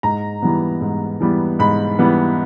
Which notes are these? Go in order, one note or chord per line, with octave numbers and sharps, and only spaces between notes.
G#2 A#5
E3 G3 B3
G#2
E3 G3 B3
G#2 B5
E3 G3 B3